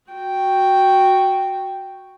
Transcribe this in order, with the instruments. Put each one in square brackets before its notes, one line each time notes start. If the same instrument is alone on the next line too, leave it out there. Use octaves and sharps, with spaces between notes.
[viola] F#4 G5